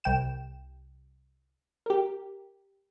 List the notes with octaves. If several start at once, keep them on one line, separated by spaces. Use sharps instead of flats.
C2 G5 E7
G4 A#4